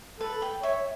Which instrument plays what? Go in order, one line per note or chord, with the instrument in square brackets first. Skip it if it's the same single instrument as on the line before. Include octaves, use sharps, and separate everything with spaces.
[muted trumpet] A4 [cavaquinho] B4
[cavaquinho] G5
[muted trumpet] C#5 [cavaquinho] E5